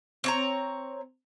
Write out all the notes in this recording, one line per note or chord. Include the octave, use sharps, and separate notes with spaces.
C4 C#5 A#5